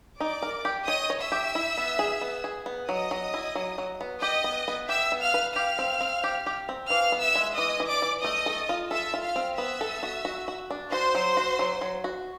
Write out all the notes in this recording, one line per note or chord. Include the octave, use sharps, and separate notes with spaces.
D#4 D5 D6
A#4
G4
C#5 D#5 D#6
C#5
E5 E6
G4
E4
B3
G#4
B3
G#4
B3
F#3 D#5 D#6
F#3
E4
F#3
F#3
B3
G4 D#5 D#6
B3
B3
G4 E5 E6
B3
F5 F6
B4
G4 F5 F6
C4
C4
G4
G4
C4
E3 F5 F6
B3
E5 E6
G#3
E3 D#5 D#6
E3
D5 D6
E3
A3 D#5 D#6
A4
F4
A4 E5 E6
F4
F5 F6
C4
B3 E5 E6
A4
F#4
F#4
F#4
D4
F#4 C5 C6
F#3
F#4
F#3
F#3
F#4